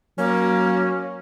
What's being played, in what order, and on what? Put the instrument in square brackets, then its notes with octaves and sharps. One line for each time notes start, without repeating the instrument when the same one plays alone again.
[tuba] F#3 [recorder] A#3 [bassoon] C#4